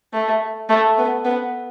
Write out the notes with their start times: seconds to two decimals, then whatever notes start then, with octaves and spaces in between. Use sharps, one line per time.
0.13 A3
0.69 A3
0.98 B3
1.25 B3